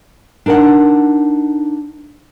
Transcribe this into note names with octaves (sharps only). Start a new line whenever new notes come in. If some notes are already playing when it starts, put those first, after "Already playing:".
D4 D#4 A#4 D#5 F#5